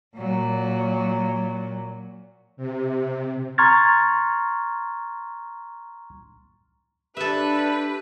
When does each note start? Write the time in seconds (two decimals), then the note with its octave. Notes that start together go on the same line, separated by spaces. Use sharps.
0.16 A#2 F#3
2.57 C3
3.58 A#5 C6 C#6 F6 G#6 A6
7.17 D4 G4 A4 B4 E5